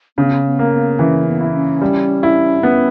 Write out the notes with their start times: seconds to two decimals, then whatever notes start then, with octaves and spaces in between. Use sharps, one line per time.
0.17 C#3 B3
0.46 B3
0.59 A#3
0.72 B3
0.99 E3 C#4
1.27 B3
1.41 E4
1.54 C#4
1.82 G3
2.23 E4
2.63 B3 C#4